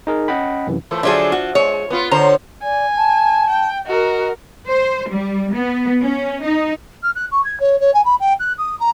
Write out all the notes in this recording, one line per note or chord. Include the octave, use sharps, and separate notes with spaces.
D#4 G#4 A#4
C#4 D#5 F#5 G5 B5
F#2 C3 E3
E3 F3 A3
D3 F3 F#3 F4 G#4 E5
F#4
G#3 C#5
B3 F4
D3 C5 C#5 A#5
D5 G#5
A5
G5
F#4 A#4 D#5
C5
G3
B3
C#4
D#4
F6
F#6
C#6
G#6
C#5
C#5
G#5
B5
G5
F#6
D#6
A#5